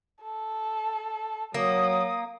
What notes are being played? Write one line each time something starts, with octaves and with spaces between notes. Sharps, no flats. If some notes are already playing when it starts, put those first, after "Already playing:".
A4
F#3 A#3 D#6